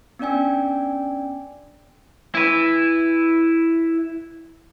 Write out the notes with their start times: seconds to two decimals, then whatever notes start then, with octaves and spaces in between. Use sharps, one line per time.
0.19 B3 C#4 D4 D5 G5 G#5
2.35 E4 B4